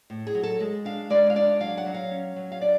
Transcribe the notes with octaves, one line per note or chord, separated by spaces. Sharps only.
A2
G#4
F#3
A4
G#3
D4 F5
G#3 D5
F5
D4 D5
F#3 F5
F#5
F#3
F5
C#4
F#3
F5
D4 D5